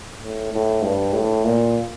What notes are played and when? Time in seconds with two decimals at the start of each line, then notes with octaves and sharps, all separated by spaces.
0.22 A2
0.53 A2
0.82 G2
1.13 A2
1.45 A#2